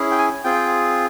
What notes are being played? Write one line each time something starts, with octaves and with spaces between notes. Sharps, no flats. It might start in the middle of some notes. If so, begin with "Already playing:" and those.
Already playing: C#4 E4 G#4
G5
G#5
C4 F4 G#4 G5